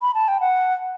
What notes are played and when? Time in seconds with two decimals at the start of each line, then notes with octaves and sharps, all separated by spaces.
0.02 B5
0.14 A5
0.28 G5
0.41 F#5